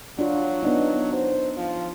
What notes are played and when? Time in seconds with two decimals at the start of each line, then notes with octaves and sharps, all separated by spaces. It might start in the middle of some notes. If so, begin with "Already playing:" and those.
0.19 F#3 D4 F4
0.63 B3 D4 D#4
1.13 C5
1.57 F3